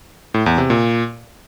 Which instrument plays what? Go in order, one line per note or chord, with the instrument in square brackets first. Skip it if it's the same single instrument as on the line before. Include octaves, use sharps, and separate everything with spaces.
[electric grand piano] A2
E2
C3
A#2